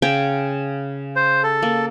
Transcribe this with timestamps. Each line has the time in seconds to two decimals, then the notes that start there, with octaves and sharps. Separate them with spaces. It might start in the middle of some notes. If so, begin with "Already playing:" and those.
0.02 C#3 C#5 G5
1.16 C5
1.44 A4
1.62 A#3